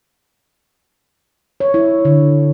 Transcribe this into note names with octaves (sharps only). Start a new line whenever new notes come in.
C#5
E4
D3